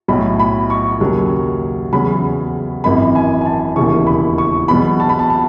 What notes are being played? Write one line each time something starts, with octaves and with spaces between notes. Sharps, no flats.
B1 A2 F#3 B5
B5
C#6
D#2 C#3 F#3
E2 C#3 F#3 B5
G#1 F#2 E3 B5
G#5
G#5
A5
E1 D#2 C#3 E3 C#6
B5
C#6
E2 B2 F#3 B5
A5
B5
A5
A5